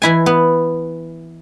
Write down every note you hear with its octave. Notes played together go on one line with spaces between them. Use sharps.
E3 E4 G#5
B3